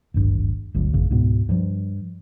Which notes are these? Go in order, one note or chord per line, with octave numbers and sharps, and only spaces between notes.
D1 G#1 G2
G1 D2 F#3
A1 F#2 C#3
C#2 G#2 B2 B3
G2 F3